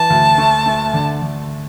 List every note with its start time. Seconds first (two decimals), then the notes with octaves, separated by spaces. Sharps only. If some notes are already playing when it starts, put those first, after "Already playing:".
Already playing: E3 A5
0.10 D2
0.38 A3
0.66 A3
0.94 D3
1.22 D3